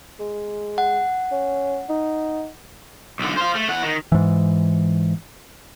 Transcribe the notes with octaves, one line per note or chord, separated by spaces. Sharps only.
G#3
F#5
C#4
D#4
B1 D3
C5 F5
A3
E2 F#5
D#3
G#2 E3